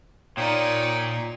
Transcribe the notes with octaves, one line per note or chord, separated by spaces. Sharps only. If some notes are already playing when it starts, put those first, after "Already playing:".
A#2 D#4 C#5 D5 G5 D#6